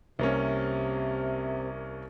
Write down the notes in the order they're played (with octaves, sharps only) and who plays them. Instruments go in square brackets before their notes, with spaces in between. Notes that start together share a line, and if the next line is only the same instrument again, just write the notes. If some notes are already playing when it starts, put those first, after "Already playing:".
[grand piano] C2 A#3 C#4 [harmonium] C3